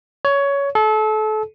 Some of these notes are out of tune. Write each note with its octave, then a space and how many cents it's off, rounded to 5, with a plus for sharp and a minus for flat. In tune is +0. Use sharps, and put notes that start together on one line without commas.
C#5 +15
A4 -30